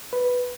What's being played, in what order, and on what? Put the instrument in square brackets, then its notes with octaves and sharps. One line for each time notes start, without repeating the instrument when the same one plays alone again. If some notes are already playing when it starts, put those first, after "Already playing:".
[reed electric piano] B4